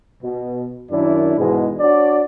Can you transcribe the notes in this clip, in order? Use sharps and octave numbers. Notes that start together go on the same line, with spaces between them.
B2
F#2 D#3 D4 E4 D5
G#2 B2 E3 G#3
D4 F#4 C#5 D5